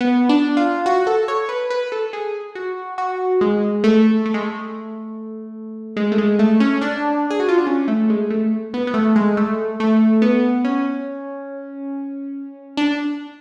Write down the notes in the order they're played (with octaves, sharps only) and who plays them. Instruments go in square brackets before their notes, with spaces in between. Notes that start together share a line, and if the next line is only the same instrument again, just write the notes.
[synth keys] B3
D4
F4
F#4
A4
C#5
B4
B4
A4
G#4
F#4
F#4
G#3
A3
A3
G#3
A3
G#3
A3
G#3
A3
C#4
D4
G#4
F#4
F4
D4
C#4
A3
G#3
A3
B3
B3
A3
G#3
A3
A3
B3
C#4
D4